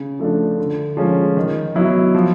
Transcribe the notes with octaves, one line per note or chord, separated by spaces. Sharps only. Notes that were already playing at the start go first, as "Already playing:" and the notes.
Already playing: C#3
F3 A3 D4
D3
F3 G#3 C#4
D#3
F#3 B3 E4
F3